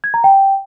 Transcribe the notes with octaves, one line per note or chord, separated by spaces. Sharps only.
G#6
A#5
G5